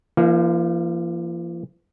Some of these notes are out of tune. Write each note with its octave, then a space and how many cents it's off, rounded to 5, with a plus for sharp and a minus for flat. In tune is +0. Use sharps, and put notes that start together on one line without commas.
F3 -45 A#3 +0 D#4 -5